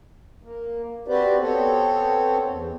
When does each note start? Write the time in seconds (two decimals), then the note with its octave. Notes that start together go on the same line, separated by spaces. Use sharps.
0.43 A#3
1.08 C4 F#4 G4 B4 C5 D5
1.40 B3 C4 A4 C5 C#5
2.46 E2